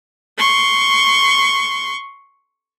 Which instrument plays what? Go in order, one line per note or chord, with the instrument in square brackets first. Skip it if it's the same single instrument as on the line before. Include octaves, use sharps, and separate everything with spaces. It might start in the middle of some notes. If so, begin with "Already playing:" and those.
[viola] C6 C#6